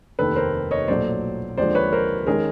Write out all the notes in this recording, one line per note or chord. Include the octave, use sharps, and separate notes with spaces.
F1 D#2 D#3 A4 B4
A#4 C5
C#5 D#5
B1 A#2 F#3 A3 C5 D5
D#2 D3 F3 G#3 C5 D5
B4 C#5
A#4 C5
D#3 G#3 C#4 G#4 A#4